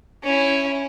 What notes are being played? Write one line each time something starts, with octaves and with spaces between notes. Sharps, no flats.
C#4 E4